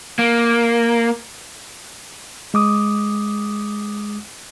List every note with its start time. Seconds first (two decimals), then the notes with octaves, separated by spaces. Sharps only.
0.19 A#3
2.54 G#3 D6 D#6